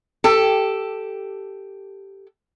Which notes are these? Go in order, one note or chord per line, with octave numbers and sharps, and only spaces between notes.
G4 A4